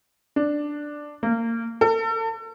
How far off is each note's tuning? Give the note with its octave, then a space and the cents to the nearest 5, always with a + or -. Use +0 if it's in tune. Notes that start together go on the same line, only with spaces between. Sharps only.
D4 +5
A#3 -25
A4 +40